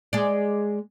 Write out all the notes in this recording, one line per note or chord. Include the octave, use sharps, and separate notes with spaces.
G#3 D5